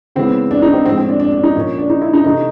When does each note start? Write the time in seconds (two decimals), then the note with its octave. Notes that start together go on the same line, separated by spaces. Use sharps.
0.15 C#3 E3 G#3 B3 C4
0.51 D4
0.62 D#4
0.73 C4
0.85 A2 F3 G#3 C4
0.97 C4
1.08 D4
1.20 D4
1.32 D4
1.43 D#4
1.56 A#2 F3 A#3 C#4
1.78 D4
1.90 D#4
2.02 E4
2.13 D#4
2.25 C3 E3 A3 D#4